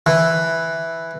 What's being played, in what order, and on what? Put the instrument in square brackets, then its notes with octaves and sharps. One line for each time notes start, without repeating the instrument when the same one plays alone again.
[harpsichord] E3